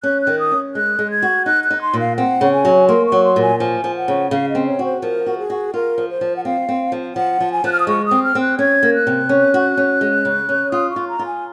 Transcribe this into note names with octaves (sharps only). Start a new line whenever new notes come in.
C#4 F#6
F#6
D#3
D#6
C#4
G#3 F#6
G#3
G#6
F#4
D#4 F#6
F#6
D#4
C6
A#2
F5
C4 F#5
C#3
G#5
F#3
A#3 C6
C#6
F#3
C6
A#2
G#5
F3 G#5
F3
F#5
C#3
C#3 F5
D#5
C4
C#5
F#4 C5
F3 A#4
F#4
G#4
F#4
F4 A#4
F3
C5
F3
F#5
C4 F5
C4
F3
F3 F#5
F3
G#5
F3 F#6
F6
D#6
G#3 C#6
D#6
C4
F6
C4
F#6
C#4 G#6
A#3
F#6
C3
C#4
F#4
C#4
G#3
C#3
C#4
F4 D#6
C#6
F4
A#5
F4
G#5